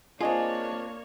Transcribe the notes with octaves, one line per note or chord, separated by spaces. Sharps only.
A#3 C4 D4 F4 G#4 C#5 D#5